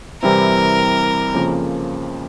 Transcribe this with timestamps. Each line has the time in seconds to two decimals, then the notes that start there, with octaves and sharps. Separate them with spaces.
0.22 C3 E3 G3 C4 E4 A#4
1.34 F2 C#3 F3 A#3